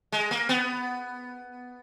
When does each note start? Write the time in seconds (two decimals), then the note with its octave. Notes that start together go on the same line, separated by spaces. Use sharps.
0.12 G#3
0.31 A#3
0.49 B3